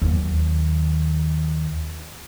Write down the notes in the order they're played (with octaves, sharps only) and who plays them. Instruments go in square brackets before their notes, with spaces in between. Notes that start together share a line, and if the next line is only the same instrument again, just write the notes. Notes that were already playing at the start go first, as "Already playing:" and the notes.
[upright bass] D#2 F#3